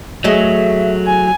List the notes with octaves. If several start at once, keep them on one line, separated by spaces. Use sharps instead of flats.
F#3 A3 G#4 D#5 E5
G#5